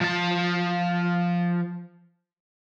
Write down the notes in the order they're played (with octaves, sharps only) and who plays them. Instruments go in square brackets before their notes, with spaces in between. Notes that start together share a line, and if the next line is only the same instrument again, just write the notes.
[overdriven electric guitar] F3 A5